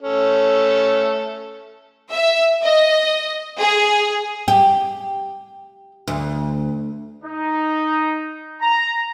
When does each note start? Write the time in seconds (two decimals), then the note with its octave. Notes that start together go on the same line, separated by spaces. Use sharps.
0.02 A3 C#4 A4
2.11 E5
2.61 D#5
3.60 G#4
4.48 G4
6.08 D2
7.24 D#4
8.61 A#5